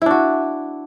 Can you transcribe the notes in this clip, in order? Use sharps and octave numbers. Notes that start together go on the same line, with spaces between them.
D4 E4 F#4